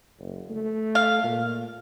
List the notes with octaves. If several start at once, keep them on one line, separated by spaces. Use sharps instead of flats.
F#1
A3
F5
A#2